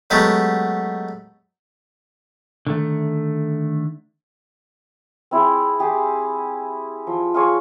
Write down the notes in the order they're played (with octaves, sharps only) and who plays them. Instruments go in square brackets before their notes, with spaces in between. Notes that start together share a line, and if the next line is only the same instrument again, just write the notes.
[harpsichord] F#3 G#3 A3 B3 G4
[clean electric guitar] D3 D#3 A3
[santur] C4 E4 G#4
G4 G#4
F3
F4 G#4 C#5